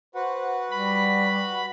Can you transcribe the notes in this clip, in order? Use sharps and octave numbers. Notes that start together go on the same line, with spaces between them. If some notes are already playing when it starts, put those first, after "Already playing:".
F#4 B4 C5 F#5
G3 B5